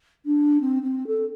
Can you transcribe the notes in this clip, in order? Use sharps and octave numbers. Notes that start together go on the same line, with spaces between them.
D4
C4
C4
A4